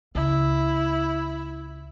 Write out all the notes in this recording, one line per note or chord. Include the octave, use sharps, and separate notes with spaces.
C#2 E4